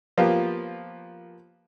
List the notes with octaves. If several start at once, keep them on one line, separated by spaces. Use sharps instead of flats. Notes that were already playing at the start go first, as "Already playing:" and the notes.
F3 A#3 B3 F4 G4